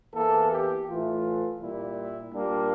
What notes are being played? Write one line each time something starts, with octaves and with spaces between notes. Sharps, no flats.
E2 E3 A#3 A4
G4
A2 E3 A3 F4
A#2 G3 A#3 E4
A#2 G3 A#3 D4